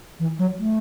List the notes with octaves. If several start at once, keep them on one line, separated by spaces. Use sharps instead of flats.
E3
F#3
A3